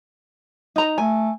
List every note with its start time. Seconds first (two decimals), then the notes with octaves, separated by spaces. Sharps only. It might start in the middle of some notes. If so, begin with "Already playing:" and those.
0.76 D#4 A#5
0.98 A3 G#5